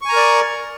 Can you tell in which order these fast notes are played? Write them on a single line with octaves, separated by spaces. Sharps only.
C#6 G#5 A#5 A#4 D5